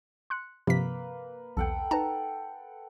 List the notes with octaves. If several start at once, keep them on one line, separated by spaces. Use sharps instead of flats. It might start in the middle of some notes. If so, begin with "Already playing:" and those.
C6 F#6 C#7
G2 C3 F3 A#3 B4 B6
B1 E2 A4 F#5 G5
D#4 B4 A5 A#5